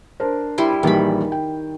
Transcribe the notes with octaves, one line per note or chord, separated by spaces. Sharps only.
D4 A#4 C5
G3 E4 C6
A#1 D#3 E3 G3 B5
G5